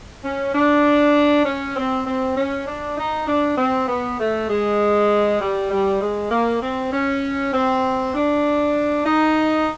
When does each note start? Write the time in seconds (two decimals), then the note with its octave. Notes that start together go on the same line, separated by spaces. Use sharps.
0.24 C#4
0.54 D4
1.45 C#4
1.76 C4
2.06 C4
2.37 C#4
2.67 D4
2.97 D#4
3.27 D4
3.58 C4
3.88 B3
4.20 A3
4.49 G#3
5.41 G3
5.71 G3
6.01 G#3
6.31 A#3
6.62 C4
6.93 C#4
7.53 C4
8.14 D4
9.05 D#4